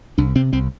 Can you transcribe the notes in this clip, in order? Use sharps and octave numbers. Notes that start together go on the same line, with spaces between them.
C2 D4
C3 C4
C2 C4